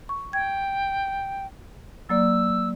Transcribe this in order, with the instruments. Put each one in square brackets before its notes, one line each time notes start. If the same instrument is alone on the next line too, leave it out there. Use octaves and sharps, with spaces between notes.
[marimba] C#6
[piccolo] G5 [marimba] G#6
[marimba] F#3 A#3 D5 [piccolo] E6